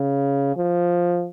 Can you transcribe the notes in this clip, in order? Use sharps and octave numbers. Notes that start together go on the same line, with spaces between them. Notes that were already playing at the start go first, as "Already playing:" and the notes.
Already playing: C#3
F3